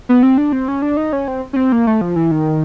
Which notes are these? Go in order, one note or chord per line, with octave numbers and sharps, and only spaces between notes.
B3
C4
D4
C4
C#4
D4
D#4
C#4
C4
C#4
C4
A#3
A3
F3
E3
D#3